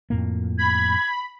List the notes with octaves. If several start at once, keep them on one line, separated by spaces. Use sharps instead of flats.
F2 A2 A#3
B5 G#6